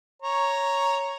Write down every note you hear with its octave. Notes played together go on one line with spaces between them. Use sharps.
C#5 A#5